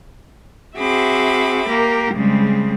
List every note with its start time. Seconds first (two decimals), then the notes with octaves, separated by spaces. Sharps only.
0.78 C4 F#4 G#4 E5 B5 D6
1.69 A#3 G4 A#4
2.14 C#3 G3 G#3 C4